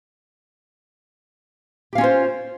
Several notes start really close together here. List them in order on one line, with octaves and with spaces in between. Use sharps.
G4 F5 C#4 F4 C5